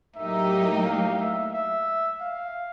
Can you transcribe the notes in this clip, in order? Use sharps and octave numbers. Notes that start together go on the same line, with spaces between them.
A2 F#3 A#3 D#4 G4 E5
F5
E5
E5
F5